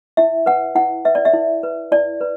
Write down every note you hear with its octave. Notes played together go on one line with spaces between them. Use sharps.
E4 E5
B4 F#5
E4 F#5
B4 E5
D5
E5
E4
B4
E4 D5
B4